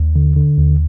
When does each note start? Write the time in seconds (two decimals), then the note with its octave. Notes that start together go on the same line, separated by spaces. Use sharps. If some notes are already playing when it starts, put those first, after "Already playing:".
Already playing: D#2
0.16 D3
0.36 D3
0.58 D#2